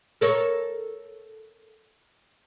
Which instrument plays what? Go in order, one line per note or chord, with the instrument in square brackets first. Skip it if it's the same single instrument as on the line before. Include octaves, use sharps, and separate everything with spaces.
[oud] A4 A#4 C#5